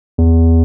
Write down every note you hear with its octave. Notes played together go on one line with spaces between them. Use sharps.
E2